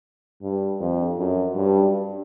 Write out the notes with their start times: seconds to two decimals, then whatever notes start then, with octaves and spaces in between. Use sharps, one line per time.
0.42 G2
0.80 F2
1.18 F#2
1.56 G2